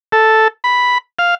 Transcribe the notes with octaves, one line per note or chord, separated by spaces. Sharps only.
A4
B5
F5